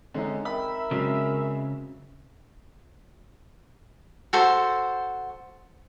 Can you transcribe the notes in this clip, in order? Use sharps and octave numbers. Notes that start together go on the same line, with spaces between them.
D3 G#3 C4 C#4 D#4
A#4 E5 G5 B5
C#3 F#3 G#3 C4 B5
F#4 A4 C5